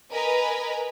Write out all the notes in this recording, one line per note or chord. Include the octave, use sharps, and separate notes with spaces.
A#4 B4 D#5 G#5 A#5 B5